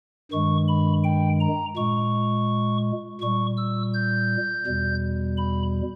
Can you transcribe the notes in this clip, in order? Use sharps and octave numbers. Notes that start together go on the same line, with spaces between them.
G2 D#3 G#3 C#6
B5
G5
A#5
A#2 G#3 C#6
A#2 G3 C#6
E6
G6
E2 B2 G3
B5